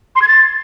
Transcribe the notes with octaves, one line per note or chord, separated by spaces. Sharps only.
C6
G#6
A6